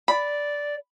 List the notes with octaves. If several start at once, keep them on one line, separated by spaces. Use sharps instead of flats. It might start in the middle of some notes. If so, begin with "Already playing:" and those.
D5 B5